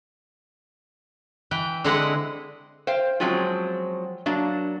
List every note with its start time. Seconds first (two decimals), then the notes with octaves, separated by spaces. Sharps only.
1.51 E3 B4 G5
1.84 D3 G#3 C4 E4 D#5 F#5
2.87 C5 F5 G5
3.20 F3 F#3 G#3 C4 C#4 F4
4.26 F#3 A#3 D4